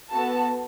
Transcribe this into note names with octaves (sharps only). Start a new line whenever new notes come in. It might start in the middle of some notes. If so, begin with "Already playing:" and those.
B3 F#4 A4 A5